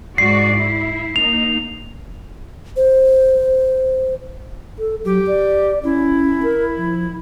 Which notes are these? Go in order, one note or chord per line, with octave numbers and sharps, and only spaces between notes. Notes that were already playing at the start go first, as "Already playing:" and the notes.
G#2 F#4 D5 C7
E4
A#3 D#4 F7
C5
A4
F#3 G4
D5
C#4 E4
A#4
F3